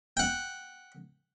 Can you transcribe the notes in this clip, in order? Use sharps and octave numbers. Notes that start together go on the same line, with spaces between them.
F#5 G5